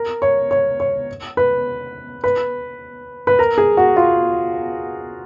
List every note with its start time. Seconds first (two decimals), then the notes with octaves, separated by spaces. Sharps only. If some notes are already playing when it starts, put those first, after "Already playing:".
Already playing: A#4
0.22 C#5
0.51 C#5
0.80 C#5
1.37 B4
2.24 B4
3.27 B4
3.39 A#4
3.58 G#4
3.77 F#4
3.96 F4